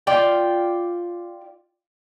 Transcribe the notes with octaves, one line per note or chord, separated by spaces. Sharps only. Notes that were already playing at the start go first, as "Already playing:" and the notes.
F4 D5 G5